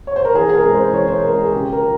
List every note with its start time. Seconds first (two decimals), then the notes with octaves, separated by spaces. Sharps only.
0.07 C#5
0.16 C5
0.25 A#4
0.34 E3 G#4
0.49 G#4
0.54 A#4
0.64 G#3 C4
0.74 C5
0.93 E3 C#5
1.08 C5
1.23 G#3 C4 A#4
1.38 G#4
1.52 C#3 G4
1.73 A#4
1.81 F3